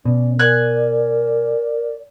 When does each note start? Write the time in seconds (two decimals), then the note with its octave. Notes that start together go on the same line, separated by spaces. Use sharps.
0.05 B2 C#4 D5
0.39 A#4 D5 G#5 F#6